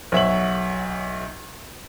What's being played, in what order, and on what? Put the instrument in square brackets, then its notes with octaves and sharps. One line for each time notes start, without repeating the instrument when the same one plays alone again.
[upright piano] B1 C#5 E5 F#5 F#7